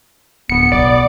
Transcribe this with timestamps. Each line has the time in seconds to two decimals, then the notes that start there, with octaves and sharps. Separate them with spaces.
0.49 D1 B3 C#7
0.72 B1 D5